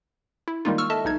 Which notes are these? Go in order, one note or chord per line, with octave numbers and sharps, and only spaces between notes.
E4
D#3 G3 G#3 A#3 D#4 F4
C#6 E6 F6
A4 D#5 E5 A5
B1 D#4 G#6